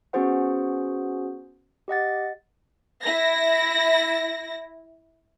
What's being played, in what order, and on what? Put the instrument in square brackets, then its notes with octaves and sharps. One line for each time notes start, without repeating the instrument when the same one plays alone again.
[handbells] B3 C#4 F#4 G#4 C5 F#5
G4 D#5 F#5 A6
[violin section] E4 A#6